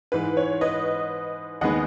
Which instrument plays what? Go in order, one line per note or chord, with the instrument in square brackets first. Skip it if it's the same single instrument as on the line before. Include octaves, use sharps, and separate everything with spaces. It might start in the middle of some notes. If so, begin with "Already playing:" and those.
[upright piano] G#2 E3 G#3 [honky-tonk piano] B4
[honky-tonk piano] C#5
B4 D#5
[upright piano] D#2 D#3 G#3 B3 [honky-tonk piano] D#5 F#5